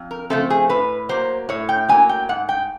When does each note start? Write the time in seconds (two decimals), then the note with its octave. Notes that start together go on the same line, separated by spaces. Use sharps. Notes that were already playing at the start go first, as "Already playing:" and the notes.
Already playing: F2
0.11 A#4
0.30 C#3 F3 A3 C4 A4
0.50 G#4
0.69 A2 B4
1.09 F#3 A#3 C5
1.49 A2 C#5
1.69 G5
1.89 F#3 A#3 G#5
2.09 G5
2.29 G#2 F#5
2.49 G5